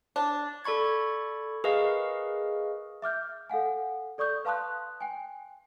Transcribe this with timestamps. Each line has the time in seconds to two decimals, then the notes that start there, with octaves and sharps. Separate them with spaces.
0.16 D4
0.65 A4 D5 B5 C#6 G#6
1.64 G#4 A#4 B4 D#5 F5 C#6
3.02 E5 D6 F6 G6
3.50 A4 F5 F#5 G#5
4.18 A4 D5 C#6 D#6 G6
4.45 B4 F5 A5 C6 D#6 F#6
5.01 G5 G#5